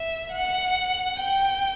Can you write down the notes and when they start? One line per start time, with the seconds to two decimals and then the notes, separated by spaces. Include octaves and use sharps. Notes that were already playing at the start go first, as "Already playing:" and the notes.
Already playing: E5
0.32 F#5
1.21 G5